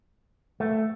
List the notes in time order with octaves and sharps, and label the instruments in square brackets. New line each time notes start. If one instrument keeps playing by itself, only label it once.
[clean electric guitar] A3